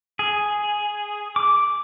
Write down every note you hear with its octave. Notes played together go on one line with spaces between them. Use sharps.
G#4
D6